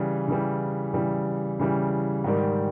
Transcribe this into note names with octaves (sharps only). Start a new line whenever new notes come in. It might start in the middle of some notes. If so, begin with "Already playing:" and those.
Already playing: C#3 E3 G3
C#3 E3 G3
C#3 E3 G3
C#3 E3 G3
G#2 D#3 G3